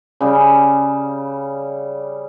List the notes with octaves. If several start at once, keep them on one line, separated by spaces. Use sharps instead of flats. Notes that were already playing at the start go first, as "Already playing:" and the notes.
C#3 G3